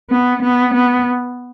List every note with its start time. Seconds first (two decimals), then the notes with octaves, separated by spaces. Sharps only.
0.10 B3
0.43 B3
0.75 B3